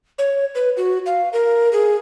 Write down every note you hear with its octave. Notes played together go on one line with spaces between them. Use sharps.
C#5
B4
F#4
F5
A#4
G#4